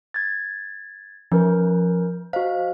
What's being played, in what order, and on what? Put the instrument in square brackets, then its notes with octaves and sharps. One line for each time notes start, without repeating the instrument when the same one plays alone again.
[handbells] G#6 A6
[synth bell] F3 [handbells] C#4 A#4 B4
[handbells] F#4 D#5 F5 [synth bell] C5